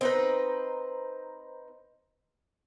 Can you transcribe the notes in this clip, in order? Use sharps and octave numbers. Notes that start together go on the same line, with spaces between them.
C4 D#4 B4